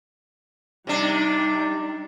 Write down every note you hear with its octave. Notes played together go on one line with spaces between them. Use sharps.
C3 G3 D4 D#4